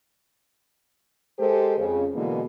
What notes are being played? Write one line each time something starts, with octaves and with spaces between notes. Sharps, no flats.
G#3 G4 A4 A#4 C5
F2 C#3
B2 D3 E3 G#3 A#3 B3